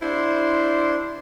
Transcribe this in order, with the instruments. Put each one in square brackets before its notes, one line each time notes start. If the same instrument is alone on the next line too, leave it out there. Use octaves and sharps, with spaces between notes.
[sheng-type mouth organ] D4 C5 C6 [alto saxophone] E4